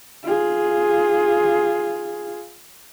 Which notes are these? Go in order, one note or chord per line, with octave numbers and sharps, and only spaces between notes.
F4 G#4